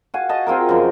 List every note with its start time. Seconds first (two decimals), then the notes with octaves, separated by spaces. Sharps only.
0.14 F#4 F5 G#5
0.29 D#5 A5 C#6
0.47 C4 F4 G#4 A#4
0.69 F#2 C#3 F3